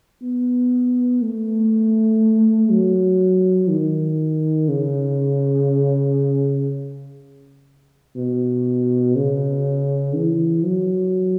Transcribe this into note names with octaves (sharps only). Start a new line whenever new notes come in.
B3
A3
F#3
D#3
C#3
B2
C#3
E3
F#3